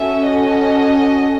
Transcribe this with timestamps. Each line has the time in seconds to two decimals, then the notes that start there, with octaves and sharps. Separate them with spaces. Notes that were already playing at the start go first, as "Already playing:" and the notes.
Already playing: C#4 F#4 A4 E5
0.26 D#5